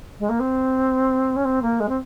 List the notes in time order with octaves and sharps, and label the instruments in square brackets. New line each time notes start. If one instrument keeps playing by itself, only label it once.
[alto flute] G#3
A#3
C4
C#4
C4
A#3
G#3
C4